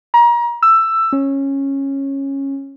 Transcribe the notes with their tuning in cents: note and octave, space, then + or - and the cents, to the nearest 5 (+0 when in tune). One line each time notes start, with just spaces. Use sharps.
A#5 +30
E6 +10
C#4 -15